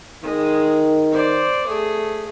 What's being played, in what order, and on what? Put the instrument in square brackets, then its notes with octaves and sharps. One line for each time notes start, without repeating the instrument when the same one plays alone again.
[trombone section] D#3 [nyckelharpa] G#3
[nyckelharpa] C5 D5
A3 G#4